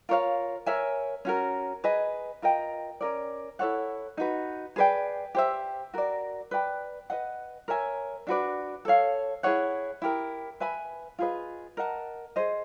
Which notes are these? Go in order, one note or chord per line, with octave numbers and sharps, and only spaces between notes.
F4 A#4 C#5 F5
A#4 C#5 E5 G#5
C#4 F#4 A#4
G#4 B4 D#5 G#5
F4 A#4 D#5 G5
C#4 F4 A#4 D5
E4 A4 C#5 F#5
D#4 F#4 B4
G#4 B4 D5 G5
G4 C5 E5
F#4 A#4 D5
B4 D5 G5 B5
B4 D#5 F#5
A#4 C#5 E5 G#5
D4 F#4 B4 D5
A4 C#5 F5
E4 G#4 C#5 F#5
E4 G4 A#4
B4 E5 G#5 B5
F4 G#4 B4 D#5
A#4 D#5 F#5 A5
G#4 C5 D#5